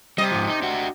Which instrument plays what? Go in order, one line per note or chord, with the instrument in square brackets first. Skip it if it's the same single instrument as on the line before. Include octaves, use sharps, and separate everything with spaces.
[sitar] C3 D#5 [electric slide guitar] G3
[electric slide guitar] G#2 F3
D#4
D4 F#4